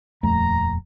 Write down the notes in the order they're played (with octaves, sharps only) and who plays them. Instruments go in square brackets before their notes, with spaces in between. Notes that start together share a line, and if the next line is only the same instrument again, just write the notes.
[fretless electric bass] D#1 F2 A3 [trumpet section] A#5